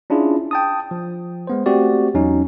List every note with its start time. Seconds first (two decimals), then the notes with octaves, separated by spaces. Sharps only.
0.10 C#4 D4 E4 F4 G#4
0.51 G5 A5 D#6
0.91 F3
1.47 G#3 B3 C5
1.66 A3 C4 F#4 G4 D5
2.14 E2 F#3 C#4 D#4